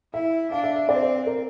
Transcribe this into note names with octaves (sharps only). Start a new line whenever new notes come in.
E4 E5
D4 F5
E5
E5
C4 D5
C5
D5
A#4